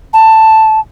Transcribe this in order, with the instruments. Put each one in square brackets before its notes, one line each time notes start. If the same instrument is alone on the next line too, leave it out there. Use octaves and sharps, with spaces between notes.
[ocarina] A5